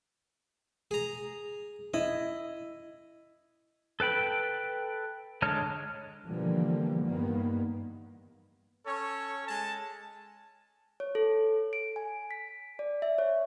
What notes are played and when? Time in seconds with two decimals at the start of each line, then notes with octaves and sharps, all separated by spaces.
0.91 G#4 A#5
1.94 E4 D#5
4.00 A4 B4 G5 B5
5.42 D3 G#3 C#5 A5 F6
6.25 B2 D3 E3 F3 G3 A#3
7.04 G2 D#3 A#3 B3
8.85 C#4 A4 C#5
9.47 G#3 G#5 A5
11.00 C#5
11.15 A4
11.73 D7
11.96 G#5
12.31 B6
12.79 D5
13.02 E5
13.18 C#5